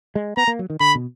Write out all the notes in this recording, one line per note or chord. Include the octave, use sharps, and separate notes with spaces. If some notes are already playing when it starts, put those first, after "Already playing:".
G#3
B3 A#5
A#3
F#3
D#3
D3 B5
B2